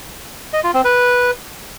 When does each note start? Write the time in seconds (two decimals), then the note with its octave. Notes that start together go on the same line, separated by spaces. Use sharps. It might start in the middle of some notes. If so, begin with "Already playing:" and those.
0.53 D#5
0.64 F4
0.74 C4
0.84 B4